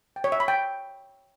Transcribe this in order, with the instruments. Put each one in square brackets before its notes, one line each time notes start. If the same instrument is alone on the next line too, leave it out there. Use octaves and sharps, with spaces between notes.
[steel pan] G5
C#5
E5
B5
G5